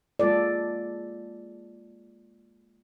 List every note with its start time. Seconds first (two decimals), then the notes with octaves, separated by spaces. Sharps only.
0.20 G#3 A#3 F4 A4 D5